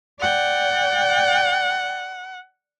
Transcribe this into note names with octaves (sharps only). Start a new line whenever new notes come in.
D5 F#5 G5